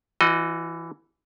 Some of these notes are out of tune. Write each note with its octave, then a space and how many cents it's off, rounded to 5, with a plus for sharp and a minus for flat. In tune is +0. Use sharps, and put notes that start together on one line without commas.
E3 +10 F#4 -30 D#5 +0